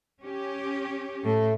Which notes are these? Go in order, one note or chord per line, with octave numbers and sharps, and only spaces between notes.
C#4 G4
A2 A3